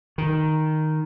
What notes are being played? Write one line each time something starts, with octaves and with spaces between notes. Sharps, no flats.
D#3